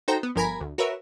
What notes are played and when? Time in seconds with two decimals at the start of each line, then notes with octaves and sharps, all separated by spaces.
0.08 D#4 F#4 A4 C5 G5 A#5
0.23 B3
0.35 G1 F3 A#4 G#5 A#5 B5
0.60 D2
0.78 F#4 A#4 B4 C#5 E5